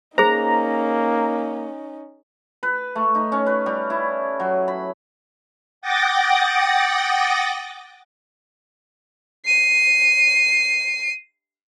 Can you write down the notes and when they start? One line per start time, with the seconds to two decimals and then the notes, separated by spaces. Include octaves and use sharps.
0.18 A#3 C#4 D#4 G#4 C5 A#5
2.63 B4
2.95 A3
3.15 D#4
3.32 C#4
3.46 B4
3.66 G3
3.90 E4
4.40 F#3
4.68 B5
5.82 F#5 G5 D6 D#6 A6 A#6
9.45 C7 D#7